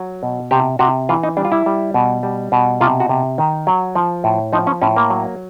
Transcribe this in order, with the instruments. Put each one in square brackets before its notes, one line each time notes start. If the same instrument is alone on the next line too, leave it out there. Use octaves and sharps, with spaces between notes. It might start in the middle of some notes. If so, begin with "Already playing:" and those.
Already playing: [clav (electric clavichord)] F#3
B2
C3 G4
C3 F#4
E3 F4
D#4
G3 D4
F4
E4
G3
B2
G3
B2
C3 F4
F#4
C3
D#3
F#3
F3
A2
F3 D#4
C#4
A2 C#4
A#3
F#3